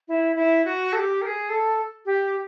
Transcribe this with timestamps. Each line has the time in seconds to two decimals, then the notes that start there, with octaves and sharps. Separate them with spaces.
0.08 E4
0.36 E4
0.65 F#4
0.93 A4
0.98 G4
1.22 A#4
1.26 G#4
1.49 A4
2.06 G4